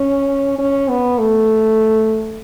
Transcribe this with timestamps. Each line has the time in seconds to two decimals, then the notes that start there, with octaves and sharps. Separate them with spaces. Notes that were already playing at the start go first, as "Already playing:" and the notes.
Already playing: C#4
0.59 C#4
0.89 B3
1.19 A3